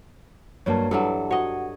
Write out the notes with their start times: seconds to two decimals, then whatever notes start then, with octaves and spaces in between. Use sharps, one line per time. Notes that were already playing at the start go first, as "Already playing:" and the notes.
0.66 G2 F#3 A#3 C#5 A5
0.91 G2 E3 F#3 A4
1.31 F#4 C#5 D#5 F#5